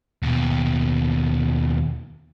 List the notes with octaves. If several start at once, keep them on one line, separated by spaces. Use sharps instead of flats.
D#2 B2